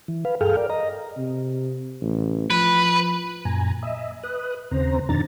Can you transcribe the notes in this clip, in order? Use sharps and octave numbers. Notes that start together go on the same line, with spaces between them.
E3
B4 F5
G2 G#4 A4 F5 G5 F6
A#4 D5
D#5 A#5
C3
A1
F3 B4
F#2 A#2 G#5 A#5
D#5 E5
B4 D#6 F#6
D#2 C#3 C4 C5 A#5
F2 B2 D#3 D4 A#5 A6